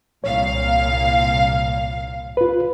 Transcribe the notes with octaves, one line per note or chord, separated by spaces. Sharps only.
C2 A#2 C#5 F5
F4 B4